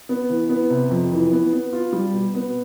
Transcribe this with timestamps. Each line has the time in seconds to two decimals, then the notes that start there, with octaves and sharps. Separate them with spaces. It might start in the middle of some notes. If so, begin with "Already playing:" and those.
0.09 B3
0.30 E3
0.49 B3
0.70 C3
0.90 F2
1.12 E3
1.31 B3
1.53 B3
1.73 F4
1.93 G3
2.13 B2
2.34 B3